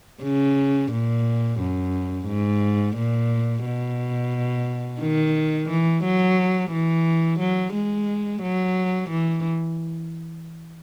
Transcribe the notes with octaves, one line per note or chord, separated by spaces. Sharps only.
C#3
A#2
F#2
G#2
A#2
B2
D#3
E3
F#3
E3
F#3
G#3
F#3
E3